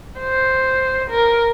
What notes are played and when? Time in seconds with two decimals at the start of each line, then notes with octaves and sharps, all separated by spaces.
0.20 C5
1.11 A#4